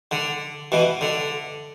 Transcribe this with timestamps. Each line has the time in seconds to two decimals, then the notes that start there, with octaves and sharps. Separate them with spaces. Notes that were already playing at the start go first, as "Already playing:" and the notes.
0.11 D3
0.72 B2 E3
1.01 D3